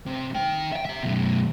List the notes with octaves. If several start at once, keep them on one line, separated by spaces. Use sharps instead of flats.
C3
D#3 G5
E5 G5
G4 E5
F#2 B2